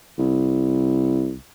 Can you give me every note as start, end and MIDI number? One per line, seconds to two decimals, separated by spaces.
0.19 1.35 36